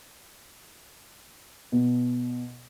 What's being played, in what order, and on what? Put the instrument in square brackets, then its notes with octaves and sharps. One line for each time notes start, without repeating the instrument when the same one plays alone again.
[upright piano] B2